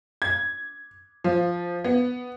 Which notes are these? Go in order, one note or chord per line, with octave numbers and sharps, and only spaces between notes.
G#6
F3
B3